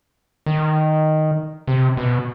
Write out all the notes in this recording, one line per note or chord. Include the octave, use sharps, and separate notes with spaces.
D#3
C3
B2